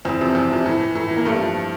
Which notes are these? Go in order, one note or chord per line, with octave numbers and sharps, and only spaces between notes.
E2 C4
C3 F3
E2
C3 F3
A2
E3
A2
E3
A#3
G2 A3
F3